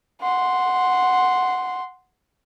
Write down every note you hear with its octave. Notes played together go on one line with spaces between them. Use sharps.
F#5 C6